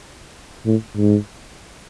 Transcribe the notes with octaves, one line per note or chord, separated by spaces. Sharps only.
A2
G#2